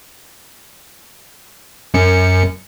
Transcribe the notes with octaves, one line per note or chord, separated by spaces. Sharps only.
F#2 C#7